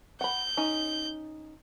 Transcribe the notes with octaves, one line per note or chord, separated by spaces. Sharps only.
F#5 B5 G6
C#4 D#4